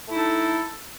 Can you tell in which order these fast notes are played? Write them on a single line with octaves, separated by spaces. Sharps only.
A3 E4 D#4 A4